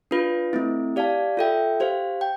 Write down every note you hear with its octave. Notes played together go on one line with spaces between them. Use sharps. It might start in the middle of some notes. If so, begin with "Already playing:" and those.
D4 F4 B4
A3 C4 E4
G4 D5 F5 A5
F4 A4 E5 G5
G4 C5 F5
G5